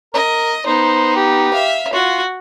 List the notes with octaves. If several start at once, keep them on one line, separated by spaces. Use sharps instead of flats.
A#4 D#5
B3 D#4 C5
G4
E5 F5
F4 F#4